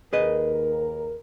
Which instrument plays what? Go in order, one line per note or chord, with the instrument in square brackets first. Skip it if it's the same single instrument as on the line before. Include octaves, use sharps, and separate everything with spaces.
[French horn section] D#2 A#4 [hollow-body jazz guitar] G#4 B4 D#5